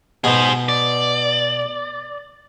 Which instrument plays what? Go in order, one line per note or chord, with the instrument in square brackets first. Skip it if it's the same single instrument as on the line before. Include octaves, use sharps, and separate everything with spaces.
[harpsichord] B2 [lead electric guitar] G#4 C5
[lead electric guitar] D5